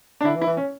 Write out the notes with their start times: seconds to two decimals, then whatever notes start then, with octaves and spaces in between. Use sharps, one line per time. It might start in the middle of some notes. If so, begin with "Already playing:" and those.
0.21 D4
0.25 D3 E4
0.36 E3
0.41 E4
0.46 E3
0.57 C#4